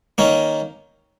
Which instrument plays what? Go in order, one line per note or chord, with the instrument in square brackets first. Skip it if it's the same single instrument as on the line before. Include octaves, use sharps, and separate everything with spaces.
[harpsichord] D#3 A#3 C#4